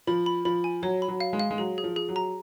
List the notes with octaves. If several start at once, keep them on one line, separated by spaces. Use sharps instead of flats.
F3 B5
B5
F3 B5
G#5
F#3 C#5
B5
F#3
F5
G#3
F5
G#3
F#3 G#4
G#4
F3
G#4
F#3
A#5